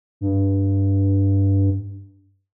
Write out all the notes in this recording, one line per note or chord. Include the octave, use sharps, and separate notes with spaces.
G2